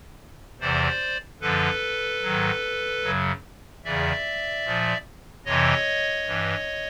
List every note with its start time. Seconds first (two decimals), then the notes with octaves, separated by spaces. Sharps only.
0.60 E2 C3 E3 C5 D5
1.41 F#2 D3 F3 A4 B4
2.22 G#2 D#3 F#3
3.04 F#2 C#3 F#3
3.84 E2 C#3 E3 D5 E5
4.65 A#2 F3
5.45 F2 C3 E3 C#5 D#5
6.26 G2 E3